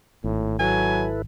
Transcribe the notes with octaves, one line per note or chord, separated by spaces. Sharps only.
G#1 A2
F#3 E4 A4 B4 G#5